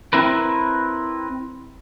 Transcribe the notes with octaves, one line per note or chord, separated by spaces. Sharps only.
C4 E4 A#4 B4